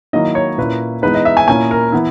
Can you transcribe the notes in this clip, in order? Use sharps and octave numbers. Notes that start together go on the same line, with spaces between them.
D#3 F#3 A#3 E4 D#5
C#5
A#2 A#3 C#4 E4 B4
E3 G#3 B3 D#4 B4
D#5
E5
G#5
A#2 A#3 C#4 E4 G#5
A#4
E3 B3 E4